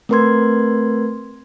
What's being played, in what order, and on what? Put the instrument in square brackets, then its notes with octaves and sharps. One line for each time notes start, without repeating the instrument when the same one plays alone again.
[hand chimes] A3 C4 A#4 B4 C6 G#6